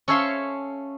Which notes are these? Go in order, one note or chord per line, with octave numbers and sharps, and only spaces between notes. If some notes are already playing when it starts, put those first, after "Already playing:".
C#4 A4 C#5 E5 F5 C6